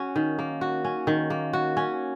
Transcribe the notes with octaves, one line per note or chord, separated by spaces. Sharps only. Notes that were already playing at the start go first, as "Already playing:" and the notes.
Already playing: C#4 F#4
D#3
A#3
F#4
C#4
D#3
A#3
F#4
C#4